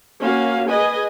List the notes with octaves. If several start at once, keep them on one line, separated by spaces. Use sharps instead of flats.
A#3 C#4 F#4 F5
G#4 B4 D#5 G#5